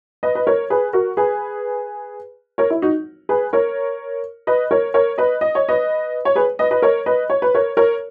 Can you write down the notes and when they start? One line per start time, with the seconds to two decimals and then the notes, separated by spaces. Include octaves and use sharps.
0.23 B4 D#5
0.35 B4
0.47 A#4 C#5
0.70 G#4 B4
0.93 F#4 A#4
1.17 G#4 B4
2.58 A#4 C#5
2.70 E4
2.82 D#4 F#4
3.29 G#4 B4
3.53 A#4 C#5
4.47 B4 D#5
4.71 A#4 C#5
4.94 A#4 C#5
5.18 B4 D#5
5.41 D#5
5.55 C#5
5.69 B4 D#5
6.25 C#5
6.35 G#4 B4
6.59 B4 D#5
6.71 B4 D#5
6.82 A#4 C#5
7.06 B4 D#5
7.30 C#5
7.42 B4
7.54 A#4 C#5
7.77 A#4 C#5